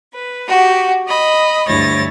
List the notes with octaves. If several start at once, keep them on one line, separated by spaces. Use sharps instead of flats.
B4
F#4 G4
D#5 B5
D2 G2 E4 C#5 A6 A#6